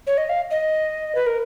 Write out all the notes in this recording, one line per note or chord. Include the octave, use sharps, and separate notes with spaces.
C#5
D#5
F5
D#5
B4
A#4